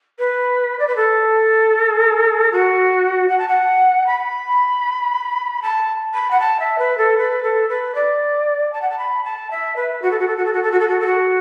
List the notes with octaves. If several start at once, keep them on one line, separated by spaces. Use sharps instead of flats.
B4
D5
B4
A4
F#4
F#5
A5
F#5
B5
A5
B5
F#5
A5
E5
B4
A4
B4
A4
B4
D5
A5
F#5
A5
B5
A5
E5
B4
F#4
A4
F#4
A4
F#4
A4
F#4
A4
F#4
A4
F#4
A4
F#4